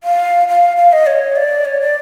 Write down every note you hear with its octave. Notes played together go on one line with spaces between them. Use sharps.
F5
F5
F5
D#5
C#5
D5
C#5
D5